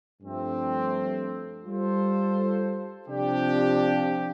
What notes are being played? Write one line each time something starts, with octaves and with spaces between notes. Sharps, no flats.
G2 F3 A3 C4
G3 F4 A4 C5
C3 F3 D4 G4